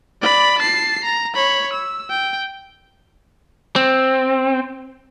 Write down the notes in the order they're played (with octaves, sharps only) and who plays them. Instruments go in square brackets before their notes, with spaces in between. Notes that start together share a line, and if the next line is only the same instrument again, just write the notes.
[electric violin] D5 B5
A5 C7
A#5
C#5 B5
E6
G5
[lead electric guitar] C4